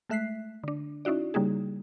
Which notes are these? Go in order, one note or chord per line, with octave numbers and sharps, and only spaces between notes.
G#3 A3 E5 F#6 B6 C7
D3 D4
C#4 D#4 E4 F#4 D5
C#3 G3 A#3 D#4 G#4